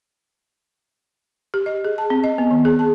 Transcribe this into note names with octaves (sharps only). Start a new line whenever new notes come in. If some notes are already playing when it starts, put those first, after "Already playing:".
G4
D#5
G#4
A5
C4
D#5
B3
D#3
G#4
A5